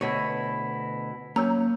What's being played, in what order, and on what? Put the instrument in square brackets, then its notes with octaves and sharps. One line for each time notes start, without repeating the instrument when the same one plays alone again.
[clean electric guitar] D2 B2 E4 [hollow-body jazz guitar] B4 C#5
[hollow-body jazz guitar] F#3 C#4 [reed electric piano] A#3 [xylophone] A#5 E6 G6